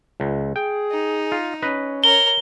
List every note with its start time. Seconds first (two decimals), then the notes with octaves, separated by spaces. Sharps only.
0.20 C#2
0.56 G#4 G5
0.91 D#4
1.32 F4
1.62 C#4 B4 D#5
2.04 A#4 C#5 G7